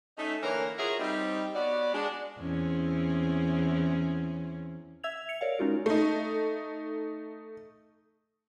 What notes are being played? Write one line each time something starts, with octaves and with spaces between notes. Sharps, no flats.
A3 C#4 D#4
D3 E3 A#3 A#4 C#5
F4 F#4 G#4 A#4 C#5 E5
G3 C4 D#4
B3 F#4 C#5 D5
G#3 D4
E2 C4 C#4
E5 E6 G#6 F7
C#7 F7
A#4 C#5 D5 F5
G#3 C#4 D#4 F4 F#4 A#4
A3 D#4